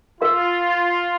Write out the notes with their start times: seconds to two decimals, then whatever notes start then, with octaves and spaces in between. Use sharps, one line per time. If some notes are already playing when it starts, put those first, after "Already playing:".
0.21 F4 A#4 F5 C6